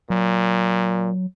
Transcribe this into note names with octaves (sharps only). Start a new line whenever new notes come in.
A#2 F#3